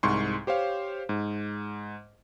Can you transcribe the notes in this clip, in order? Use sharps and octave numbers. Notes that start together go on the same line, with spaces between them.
C2 G#2 C6 C#6
G4 C5 C#5 F5
G#2